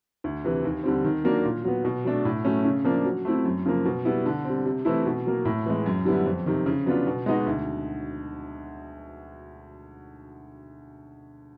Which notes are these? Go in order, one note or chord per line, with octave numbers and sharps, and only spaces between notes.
D2
C3 E3
D#2
D3 G3 C4
D#3
F#3 A#3 D4
A#2
F#3 B3
B2
F#3 A3 D4
A2
F#3 A3 C#4
C#3
F3 A#3 D4
F#3
A3 C4 E4
F#2
C#3 F3 A#3
B2
G3 B3 E4
D3
G3 C4
C3
E3 A3 C4 E4
B2
F#3 A#3
A2
E3 G#3
F#2
D3 G3 B3 E4
F2
C3 D#3
C#3
F#3 B3 D4 F4
B2
G#3 B3 D#4 F#4
D2